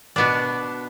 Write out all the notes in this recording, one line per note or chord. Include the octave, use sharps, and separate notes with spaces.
B2 B3 D4